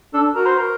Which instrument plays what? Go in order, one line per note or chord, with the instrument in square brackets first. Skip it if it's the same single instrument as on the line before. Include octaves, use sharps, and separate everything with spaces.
[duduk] D4 [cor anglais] A4
[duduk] F#4 [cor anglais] A#4
[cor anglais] C5
A#4